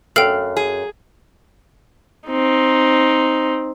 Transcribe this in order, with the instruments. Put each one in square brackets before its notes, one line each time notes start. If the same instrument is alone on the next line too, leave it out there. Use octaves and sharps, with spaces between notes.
[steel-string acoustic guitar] F#2 [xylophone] A4 G5 [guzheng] F5
[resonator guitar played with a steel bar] G#4
[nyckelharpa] C4 D#4